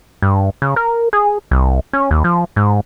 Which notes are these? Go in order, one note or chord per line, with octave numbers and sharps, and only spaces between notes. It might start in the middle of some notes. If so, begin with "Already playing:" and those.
G2
C#3
A#4
G#4
C2
C#4
D#2
F3
G#2